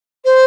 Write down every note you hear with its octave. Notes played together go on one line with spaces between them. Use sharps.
C5